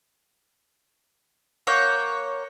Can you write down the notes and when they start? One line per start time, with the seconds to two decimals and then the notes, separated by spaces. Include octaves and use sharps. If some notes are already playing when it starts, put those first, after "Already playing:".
1.67 A#3 C#5 F#5 G6